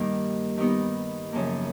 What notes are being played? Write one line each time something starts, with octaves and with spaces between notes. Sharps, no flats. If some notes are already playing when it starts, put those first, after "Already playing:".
Already playing: G2 D#3 G3 A#3
D#3 G3 B3 D#4
F#2 C#3 F3 A#3